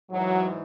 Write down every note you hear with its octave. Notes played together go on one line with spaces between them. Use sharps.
G#2 E3 F#3